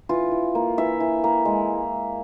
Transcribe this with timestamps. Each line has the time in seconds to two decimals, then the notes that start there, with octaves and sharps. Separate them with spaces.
0.09 E3 F4
0.31 E3
0.55 A#3
0.78 E3 E5
1.00 E3
1.24 A#3
1.45 G#3